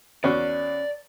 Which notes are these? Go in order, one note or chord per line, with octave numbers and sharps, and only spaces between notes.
E2 C#4 F#4 D5